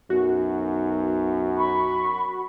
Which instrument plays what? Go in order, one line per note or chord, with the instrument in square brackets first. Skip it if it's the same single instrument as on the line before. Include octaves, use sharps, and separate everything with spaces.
[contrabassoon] B1 [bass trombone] F#2 [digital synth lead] F#4
[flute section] B5 C#6